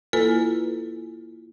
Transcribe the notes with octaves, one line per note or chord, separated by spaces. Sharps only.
A#3 E4 F4 A4 B4 G#5